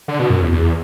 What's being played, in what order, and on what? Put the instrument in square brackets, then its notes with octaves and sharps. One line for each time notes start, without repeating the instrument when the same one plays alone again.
[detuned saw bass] D3
B2
F#2
E2
E2